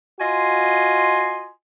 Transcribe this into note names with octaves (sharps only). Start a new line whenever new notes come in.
F4 F#4 D#5 G#5 C6